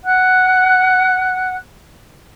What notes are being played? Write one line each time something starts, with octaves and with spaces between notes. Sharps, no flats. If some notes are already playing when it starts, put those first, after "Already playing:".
F#5 F#6